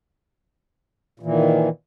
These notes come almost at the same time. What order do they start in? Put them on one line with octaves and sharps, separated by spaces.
A#2 E3 D#3